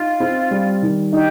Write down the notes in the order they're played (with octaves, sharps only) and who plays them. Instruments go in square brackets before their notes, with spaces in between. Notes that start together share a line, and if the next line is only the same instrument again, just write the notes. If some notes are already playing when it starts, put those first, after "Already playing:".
Already playing: [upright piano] D#4 [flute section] F4
[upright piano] C4
G3
D#3
[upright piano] D#4 [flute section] G4